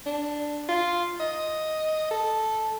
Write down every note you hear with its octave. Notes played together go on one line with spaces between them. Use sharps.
D4
F4
D#5
A4